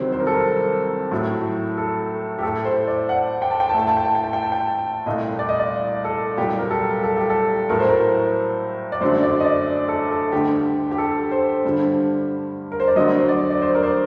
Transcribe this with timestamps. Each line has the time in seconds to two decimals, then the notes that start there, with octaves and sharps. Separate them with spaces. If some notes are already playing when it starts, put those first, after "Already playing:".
Already playing: C2 C3 D#3 F#3 C5
0.12 C5
0.20 A#4
0.27 A4
0.34 A#4
1.11 A2 F#3 A3
1.77 A4
2.38 G4
2.43 A2 A3 A4
2.65 C5
2.88 D5
3.09 F#5
3.42 G5
3.51 A5
3.60 G5
3.69 A5
3.74 A2 A3 G5
3.88 A5
3.97 G5
4.06 A5
4.15 G5
4.24 A5
4.33 G5
4.43 A5
4.52 G5
5.06 C2 A#2 A3 D#5
5.39 D5
5.49 D#5
5.60 D5
6.05 A4
6.38 C2 A#2 F#3 G4
6.59 A#4
6.71 A4
7.03 A4
7.17 G4
7.30 A4
7.69 A2 F#3 A3 A#4
7.80 C5
7.89 A#4
8.92 D5
9.01 F#2 D3 F#3 A3 C5
9.23 D5
9.40 D#5
9.44 D5
9.88 A4
10.11 A4
10.32 D2 D3 G3 G4
10.91 G4
10.98 A4
11.31 C5
11.65 G2 D3 G3
12.72 A#4
12.80 C5
12.88 D5
12.96 D2 D3 F#3 D#5
13.17 C5
13.29 D5
13.50 D5
13.62 C5
13.75 A#4
13.83 C5